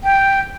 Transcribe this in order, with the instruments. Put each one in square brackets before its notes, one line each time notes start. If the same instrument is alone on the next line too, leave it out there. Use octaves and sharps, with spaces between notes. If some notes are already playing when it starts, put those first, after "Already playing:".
[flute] G5